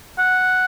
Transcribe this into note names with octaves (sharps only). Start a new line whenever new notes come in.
F#5